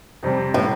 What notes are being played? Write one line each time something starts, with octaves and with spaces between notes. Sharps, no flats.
F2 C3 G3 C4
A2